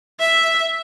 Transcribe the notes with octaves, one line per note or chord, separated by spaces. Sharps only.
E5